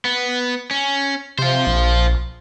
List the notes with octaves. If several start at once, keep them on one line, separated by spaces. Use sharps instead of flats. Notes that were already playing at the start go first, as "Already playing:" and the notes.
B3
C#4
C3 F4 C5
A#1